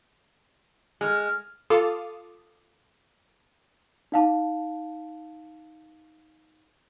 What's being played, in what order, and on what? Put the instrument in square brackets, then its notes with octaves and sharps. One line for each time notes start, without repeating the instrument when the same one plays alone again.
[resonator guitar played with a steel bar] G#3 [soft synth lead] F6
[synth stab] F4 A4 F5 A5 D6 D#6
[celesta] D#4 F5 A5